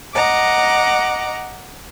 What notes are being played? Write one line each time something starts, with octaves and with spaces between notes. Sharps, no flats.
D#5 F#5 A#5 D6